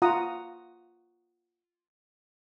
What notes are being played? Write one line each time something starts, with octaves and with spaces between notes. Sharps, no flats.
F4 F#5 A#5 D#6